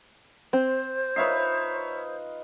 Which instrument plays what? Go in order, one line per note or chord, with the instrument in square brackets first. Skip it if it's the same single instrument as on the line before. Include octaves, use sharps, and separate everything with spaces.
[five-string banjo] C4 [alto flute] C5
[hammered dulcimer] D#4 F4 B4 [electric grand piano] C#5 E5 C7